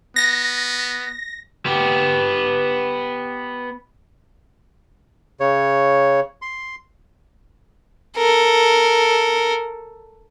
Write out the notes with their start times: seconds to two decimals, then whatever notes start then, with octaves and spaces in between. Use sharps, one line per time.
0.16 B3 A#6
1.66 B3 G4
5.40 C#3 C#5
6.42 C6
8.17 A4 A#4